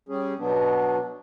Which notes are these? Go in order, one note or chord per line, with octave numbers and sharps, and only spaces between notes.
G3 C#4 G#4
B2 F#3 B3 D4